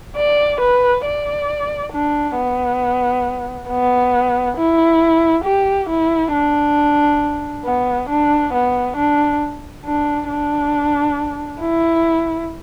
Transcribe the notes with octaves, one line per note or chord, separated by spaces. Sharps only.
D5
B4
D5
D4
B3
B3
E4
G4
E4
D4
B3
D4
B3
D4
D4
D4
E4